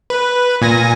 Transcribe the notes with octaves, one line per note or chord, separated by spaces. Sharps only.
B4
A#2 G#5 A#6